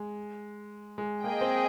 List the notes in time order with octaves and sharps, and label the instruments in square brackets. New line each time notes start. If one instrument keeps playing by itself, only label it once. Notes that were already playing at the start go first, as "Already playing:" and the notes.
Already playing: [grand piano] G#3
G#3
[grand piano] A#3 [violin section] G#4 D#5 G5
[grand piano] C4